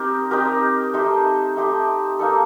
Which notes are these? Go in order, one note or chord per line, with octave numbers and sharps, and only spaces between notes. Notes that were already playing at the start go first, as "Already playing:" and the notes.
Already playing: C4 D#4 G4 A#4
C4 D#4 G4 A#4
A3 D#4 G4 C5
A3 D#4 G4 C5
A#3 D#4 A4